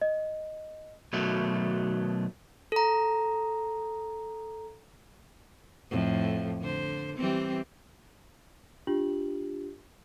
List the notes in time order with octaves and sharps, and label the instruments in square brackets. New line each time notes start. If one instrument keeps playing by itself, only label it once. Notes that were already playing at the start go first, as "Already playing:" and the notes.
[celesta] D#5
[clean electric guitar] B2 D#3 F#3 A3
[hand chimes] A4 A#5
[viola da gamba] F2 A2 F3
D3 C5
E3 G3 C4
[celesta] D4 F4 G4 F#7